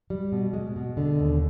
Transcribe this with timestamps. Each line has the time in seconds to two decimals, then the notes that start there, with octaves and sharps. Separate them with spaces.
0.10 G3
0.32 B2
0.53 G#3
0.76 B2
0.97 D3
1.19 D#2